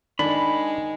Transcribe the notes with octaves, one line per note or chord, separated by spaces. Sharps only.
D#3 G#3 D4 B5